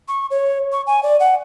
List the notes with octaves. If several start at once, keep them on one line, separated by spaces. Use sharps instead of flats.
C#6
C#5
C#6
G#5
D5
F#5